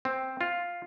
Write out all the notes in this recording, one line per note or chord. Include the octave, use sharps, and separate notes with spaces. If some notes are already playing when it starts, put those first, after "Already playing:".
C4
F4